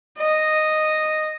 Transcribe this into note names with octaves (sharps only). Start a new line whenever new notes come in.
D#5